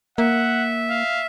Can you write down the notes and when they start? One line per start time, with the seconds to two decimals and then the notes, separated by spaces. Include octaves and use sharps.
0.18 A#3 E5 F#5
0.90 F5